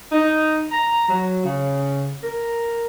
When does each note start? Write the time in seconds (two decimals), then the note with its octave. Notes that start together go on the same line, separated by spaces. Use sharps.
0.12 D#4
0.72 A#5
1.09 F#3
1.44 C#3
2.23 A#4